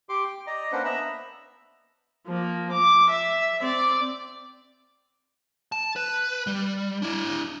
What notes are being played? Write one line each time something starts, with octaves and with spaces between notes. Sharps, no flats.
G4 C6 D6
G5
D5 D#5 A#5
A#3 C#4 D4 B4 C5 F#5
B3 E5 A#5 B5 E6
F3 A#3
D6
E5
C4 D5
A5
B4
G3
D4 E4